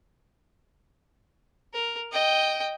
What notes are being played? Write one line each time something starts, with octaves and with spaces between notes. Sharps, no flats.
A#4
D#5 G5